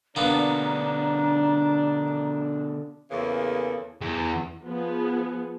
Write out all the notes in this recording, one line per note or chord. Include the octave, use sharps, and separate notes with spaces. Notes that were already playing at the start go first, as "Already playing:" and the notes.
B2 D3 A#3 B3 D4 A#5
E2 C#3 E3 A#3 A4
E2
F3 B3 G#4